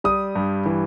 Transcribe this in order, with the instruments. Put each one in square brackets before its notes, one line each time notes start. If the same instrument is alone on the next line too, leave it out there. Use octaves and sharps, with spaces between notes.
[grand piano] G3 D#6
G2
E3